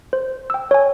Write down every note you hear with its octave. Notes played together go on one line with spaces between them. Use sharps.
C5
G5 E6
C#5 G#5